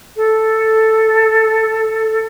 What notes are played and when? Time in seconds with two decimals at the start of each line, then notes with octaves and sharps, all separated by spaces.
0.16 A4